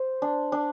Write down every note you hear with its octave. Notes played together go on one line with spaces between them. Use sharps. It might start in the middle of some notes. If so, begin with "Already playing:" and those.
Already playing: C5
D4
D4